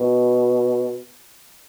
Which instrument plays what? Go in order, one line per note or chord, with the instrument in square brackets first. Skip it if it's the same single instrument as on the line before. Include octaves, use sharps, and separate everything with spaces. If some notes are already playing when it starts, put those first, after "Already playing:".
Already playing: [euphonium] B2